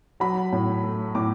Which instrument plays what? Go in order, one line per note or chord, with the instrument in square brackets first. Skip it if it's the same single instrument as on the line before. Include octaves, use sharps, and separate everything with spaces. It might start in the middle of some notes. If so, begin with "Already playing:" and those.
[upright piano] F#3 B5
A2
A3
A2 D6